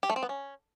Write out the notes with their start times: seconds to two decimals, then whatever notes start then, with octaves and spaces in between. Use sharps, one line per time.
0.03 G4
0.10 A3
0.16 C4
0.23 B3
0.29 C#4